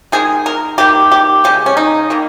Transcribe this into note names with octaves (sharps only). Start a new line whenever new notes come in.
D#3 G#3 G#4
A#4
D#3 G3 A#3 G4
G4
C#3 G#3 G4
C#4
D#4
D#3 G3 A#3